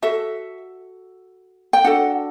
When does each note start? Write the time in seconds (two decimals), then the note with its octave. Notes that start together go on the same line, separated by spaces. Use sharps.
0.02 F#4 A4 E5
1.73 G5
1.84 D4 F#4 A4 F#5